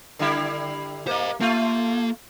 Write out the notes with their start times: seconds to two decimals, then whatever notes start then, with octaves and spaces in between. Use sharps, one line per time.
0.19 D3 G3 E4
1.07 A#3 C5 D#5
1.41 A3 A#3 F4